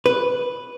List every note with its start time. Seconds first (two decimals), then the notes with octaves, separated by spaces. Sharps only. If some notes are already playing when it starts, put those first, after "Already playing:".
0.06 B4